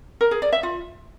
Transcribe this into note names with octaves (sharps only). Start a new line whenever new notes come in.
A#4
G#4
D5
E5
F4